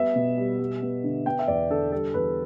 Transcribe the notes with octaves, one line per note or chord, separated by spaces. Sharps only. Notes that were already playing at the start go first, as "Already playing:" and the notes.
Already playing: G3 B3 E5
B2
G3
G3
B3
D3
B3 G5
E5
E2 D5
D3 A4
G3 A4
E2 B4